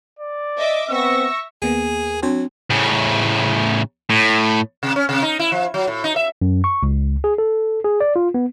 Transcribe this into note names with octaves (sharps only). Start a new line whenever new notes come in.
D5
D#5 E5 D6
B3 C4 E5 C#6 E6 A#6
D#2 A#3 B3 G#4
F#3 C4 D4 C6
A2 C#3
A2
C3
C#4
C3
D#4
E4
F3
F#3
A2
D#4
E5
F#2
C#6
C#2
G#4
A4
G#4
D5
F4
B3